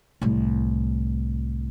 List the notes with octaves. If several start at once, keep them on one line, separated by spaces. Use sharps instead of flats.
C2 A2